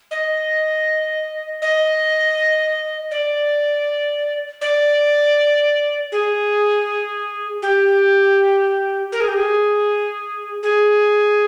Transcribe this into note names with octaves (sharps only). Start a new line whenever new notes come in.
D#5
D#5
D5
D5
G#4
G4
A#4
G#4
G4
G#4
G#4